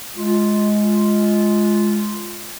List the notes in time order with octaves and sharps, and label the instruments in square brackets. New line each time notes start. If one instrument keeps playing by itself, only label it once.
[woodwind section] G#3 F4